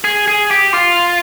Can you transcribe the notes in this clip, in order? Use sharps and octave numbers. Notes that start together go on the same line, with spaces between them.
G#4
G#4
G4
F4